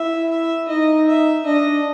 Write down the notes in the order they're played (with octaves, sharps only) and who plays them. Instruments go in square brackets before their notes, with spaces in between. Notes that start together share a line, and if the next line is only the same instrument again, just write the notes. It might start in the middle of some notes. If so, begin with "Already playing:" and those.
Already playing: [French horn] E4 [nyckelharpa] E5
[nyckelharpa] E5
[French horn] D#4 [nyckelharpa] D#5
[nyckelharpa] E5
[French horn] D4 [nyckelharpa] D#5